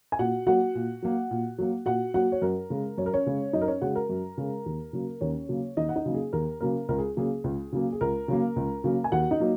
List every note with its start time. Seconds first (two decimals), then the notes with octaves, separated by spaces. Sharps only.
0.12 G#5
0.19 A#2 F#4 F#5
0.47 F#3 A#3 F#4 F#5
0.75 A#2
1.02 F#3 A#3
1.31 A#2
1.58 F#3 A#3
1.86 A#2 F#4 F#5
2.14 F#3 A#3 F#4 F#5
2.32 C#5
2.42 F#2 A#4
2.70 C#3 G#3
2.98 F#2 C#5
3.06 A#4
3.14 C#4 C#5
3.26 C#3 G#3
3.53 F#2 D#4 D#5
3.62 A#4
3.68 C#4 C#5
3.82 C#3 G#3 F#4 F#5
3.95 A#4
4.09 F#2
4.38 C#3 G#3
4.66 D#2
4.93 C#3 F#3 A#3
5.21 D#2 C#4 C#5
5.49 C#3 F#3 A#3
5.77 D#2 D#4 D#5
5.89 F#5
5.96 D#4 D#5
6.06 C#3 F#3 A#3
6.14 G#4
6.33 D#2 A#4
6.61 C#3 F#3 A#3 A#4
6.89 C#2 A#4
6.98 G#4
7.17 C#3 F#3 A#3 G#4
7.44 C#2
7.73 C#3 F#3 A#3
7.93 G#4
8.01 C#2 A#4
8.28 C#3 F#3 A#3
8.56 C#2
8.84 C#3 F#3 A#3
9.04 G#5
9.12 D#2 F#4 F#5
9.31 D#4 D#5
9.40 F#3 A#3